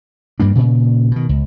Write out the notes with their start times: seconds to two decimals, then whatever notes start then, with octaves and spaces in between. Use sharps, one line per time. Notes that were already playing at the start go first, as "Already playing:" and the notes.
0.40 G2 G3 A#3 D4
0.55 A#2 C#3
1.11 B2 D#3
1.29 C#2